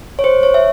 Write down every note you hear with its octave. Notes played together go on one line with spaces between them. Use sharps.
C#5
C5
C#5
E5